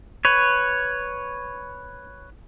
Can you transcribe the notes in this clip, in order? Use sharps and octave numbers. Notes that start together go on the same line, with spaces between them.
B4 C#5